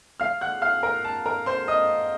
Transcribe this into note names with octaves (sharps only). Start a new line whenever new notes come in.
F5 F6
F#5 F#6
F5 F6
A#4 A#5
A5
A#4 A#5
C5 C6
D#5 D#6